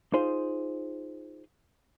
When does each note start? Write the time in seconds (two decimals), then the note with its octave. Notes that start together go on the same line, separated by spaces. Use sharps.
0.13 D#4 F4 G#4 C5